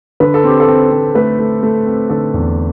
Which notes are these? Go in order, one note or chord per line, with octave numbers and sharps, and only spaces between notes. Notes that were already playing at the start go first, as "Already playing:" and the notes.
D3 B4
A4
C4 G4
A4
C4
C4
A3 B4
A3
A3
C4
D3 A4
E2